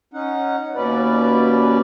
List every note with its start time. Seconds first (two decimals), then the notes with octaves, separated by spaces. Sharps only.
0.14 C#4 D#4 F#5
0.75 D#2 B2 C#4 B4 D5